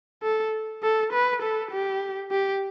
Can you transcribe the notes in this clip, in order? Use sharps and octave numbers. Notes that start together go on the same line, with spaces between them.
A4
A4
B4
A4
G4
G4